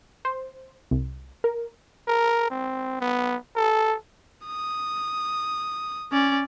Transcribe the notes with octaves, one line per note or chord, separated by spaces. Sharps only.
C5
C2
A#4
A#4
C4
B3
A4
D#6
C#4 D5